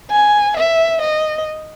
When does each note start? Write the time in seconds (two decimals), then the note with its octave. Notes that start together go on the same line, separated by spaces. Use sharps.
0.11 G#5
0.57 E5
1.02 D#5